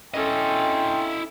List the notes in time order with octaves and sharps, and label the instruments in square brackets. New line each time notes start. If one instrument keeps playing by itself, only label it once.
[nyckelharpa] C#4 A4 [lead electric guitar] E4 D#5 [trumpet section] G5 C6